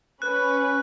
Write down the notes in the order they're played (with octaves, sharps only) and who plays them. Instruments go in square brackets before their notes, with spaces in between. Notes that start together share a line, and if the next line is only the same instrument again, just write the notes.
[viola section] C#4 B4 [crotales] F#6